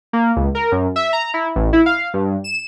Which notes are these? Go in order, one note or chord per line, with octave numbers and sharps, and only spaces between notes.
A#3
C#2
A#4
F#2
E5
A#5
E4
A1
E4
F5
G2
E7